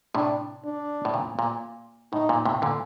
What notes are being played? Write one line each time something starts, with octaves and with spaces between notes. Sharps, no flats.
A2 C3 D4
D4
A2
A#2
A#2
A2 D#4
A#2
A2 C3
A#2 D3